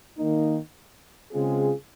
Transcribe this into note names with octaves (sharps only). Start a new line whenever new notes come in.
D#3 A#3 D#4
C#3 G#3 C4 F4 G#4